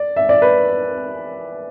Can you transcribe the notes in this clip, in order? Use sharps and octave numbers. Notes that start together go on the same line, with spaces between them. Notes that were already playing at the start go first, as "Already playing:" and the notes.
Already playing: D5
E5
D5
B4